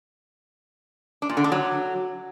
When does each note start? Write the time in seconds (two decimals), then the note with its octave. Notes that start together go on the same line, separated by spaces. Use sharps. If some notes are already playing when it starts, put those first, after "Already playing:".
1.22 D4
1.29 A#2
1.37 D3
1.44 D4
1.52 F#3